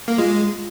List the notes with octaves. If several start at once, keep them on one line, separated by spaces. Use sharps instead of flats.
A#3
G#3 F4